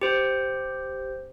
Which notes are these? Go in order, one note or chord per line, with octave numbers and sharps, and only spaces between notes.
G4 C5